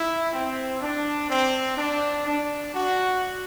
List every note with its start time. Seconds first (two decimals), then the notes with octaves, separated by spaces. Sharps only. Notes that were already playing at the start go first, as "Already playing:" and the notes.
Already playing: E4
0.31 C4
0.80 D4
1.29 C4
1.77 D4
2.26 D4
2.75 F#4